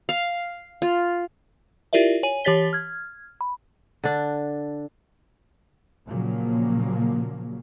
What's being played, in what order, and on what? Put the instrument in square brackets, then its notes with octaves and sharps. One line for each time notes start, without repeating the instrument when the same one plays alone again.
[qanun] F5
F4
[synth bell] E4 F4 G4 A#4 D5 E5
C#5 G#5 D#7
E3 G4 C#5 A6 B6 G7
F6 G#6
B5
[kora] D3 D4
[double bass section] A#2 C#3 F3 F#3 A#3